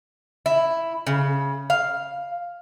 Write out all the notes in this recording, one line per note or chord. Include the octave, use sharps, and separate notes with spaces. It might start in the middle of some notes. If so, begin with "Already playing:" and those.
E4
C#3
F5